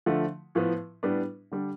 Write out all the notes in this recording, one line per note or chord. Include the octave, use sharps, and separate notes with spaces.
D3 F3 A3
A2 F3 B3
A2 G3 B3 D4
D3 G3 D4